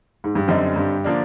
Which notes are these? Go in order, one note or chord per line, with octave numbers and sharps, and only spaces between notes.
G#2
G2
F#2 D3 G3 C4 D#4
G2
D3 F3 A#3 D4